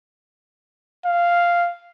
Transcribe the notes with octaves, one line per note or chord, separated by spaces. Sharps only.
F5